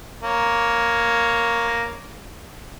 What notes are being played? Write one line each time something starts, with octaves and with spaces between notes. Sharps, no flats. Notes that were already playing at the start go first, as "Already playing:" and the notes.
A#3 C#5